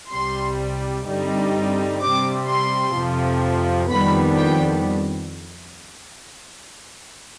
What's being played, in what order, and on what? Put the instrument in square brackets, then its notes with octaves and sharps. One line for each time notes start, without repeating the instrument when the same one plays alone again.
[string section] C2 C3 G3 C6
G2 D3 G3 C4 D#4
C3 G3 C4 D6
C6
F2 C3 F3
F2 D#3 G3 B3 D4 B5
G5